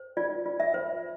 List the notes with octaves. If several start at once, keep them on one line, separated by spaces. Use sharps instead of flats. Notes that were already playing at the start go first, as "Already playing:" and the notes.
Already playing: C5
F4 D5
F4
E5
C5